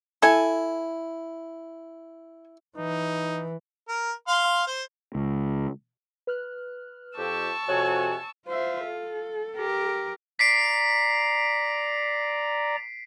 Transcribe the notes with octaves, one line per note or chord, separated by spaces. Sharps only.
E4 A4 G#5
E3 D#4
A#4
F5 C6
C5
C#2
B4 F6 F#6
F2 G4 A5 C#6 E6
F2 C3 F#4 C#5 G#5
F4 C5 E5
A4
G4 A#4
D5 A#5 B6 C7 D7